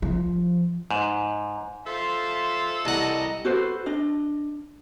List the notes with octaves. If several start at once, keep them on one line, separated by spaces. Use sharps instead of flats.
F3
G#2
F4 A4 C5 E5 C6
C2 D#5 F#5 A5 A#5
F#4 A4 B4 C5
D4 D#5